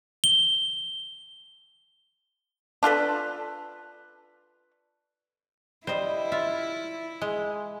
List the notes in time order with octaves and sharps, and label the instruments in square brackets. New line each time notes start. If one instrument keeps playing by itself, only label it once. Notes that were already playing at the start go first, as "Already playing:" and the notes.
[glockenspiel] G7
[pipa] D4 F4 A4 B4
[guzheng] G3 D#5 [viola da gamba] E4 [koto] C5
[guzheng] F4 [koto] E5
[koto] G#3